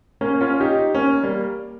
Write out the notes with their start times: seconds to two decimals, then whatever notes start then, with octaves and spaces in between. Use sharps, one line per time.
0.21 A#3 C#4
0.41 C#4 F4
0.60 D#4 G4
0.94 A#3 C#4
1.23 G3 A#3